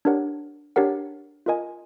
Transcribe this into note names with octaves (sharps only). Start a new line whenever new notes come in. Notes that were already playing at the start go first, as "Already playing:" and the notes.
D4 G4 A#4 C#5 F#5
D4 G4 A#4 C#5 F#5
F4 A#4 D#5 G#5